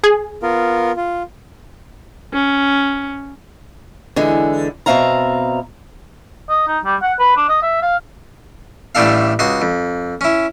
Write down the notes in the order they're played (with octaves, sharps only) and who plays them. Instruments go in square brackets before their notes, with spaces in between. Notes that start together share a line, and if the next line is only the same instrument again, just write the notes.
[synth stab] G#4
[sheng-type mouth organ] B3 F4 A#4
F4
[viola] C#4
[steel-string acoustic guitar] D3 E3 G#3
B2 E3 C4 E5 F5 A#5
[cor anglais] D#5
D#4
G3
F#5
B4
D4
D#5
E5
F5
[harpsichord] A1 A2 G3 D4 A4 F5
C#2 F#4 D#5 C6
F2
C#4 E4